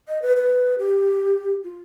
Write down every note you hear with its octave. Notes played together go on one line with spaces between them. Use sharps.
D#5
B4
B4
G4
F4